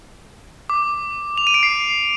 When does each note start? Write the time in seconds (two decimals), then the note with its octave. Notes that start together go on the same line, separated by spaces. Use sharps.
0.70 D6
1.38 F7
1.47 D#7
1.54 D7
1.63 C7